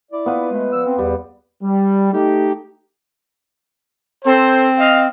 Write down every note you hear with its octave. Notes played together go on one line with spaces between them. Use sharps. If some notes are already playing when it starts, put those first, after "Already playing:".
E4 D5
B3 F4 B4
G#3 A3
F3 D5 E6
C4
E2 G3
G3
A3 D#4 G4
C4 A4 C5
D#5 F5